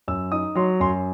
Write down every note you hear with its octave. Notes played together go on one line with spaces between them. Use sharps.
F#2 E6
D#4 D#6
F#3 C6
F#2 C6